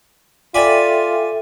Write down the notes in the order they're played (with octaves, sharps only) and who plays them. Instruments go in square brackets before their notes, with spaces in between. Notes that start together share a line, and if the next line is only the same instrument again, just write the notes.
[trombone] F4 [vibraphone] A4 E5 G5 [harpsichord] D5 G#5 B5